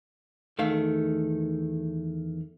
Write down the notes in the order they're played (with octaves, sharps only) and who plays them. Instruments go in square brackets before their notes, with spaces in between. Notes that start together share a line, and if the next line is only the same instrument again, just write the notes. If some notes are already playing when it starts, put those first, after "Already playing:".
[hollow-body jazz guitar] E2 D#3 A3 F5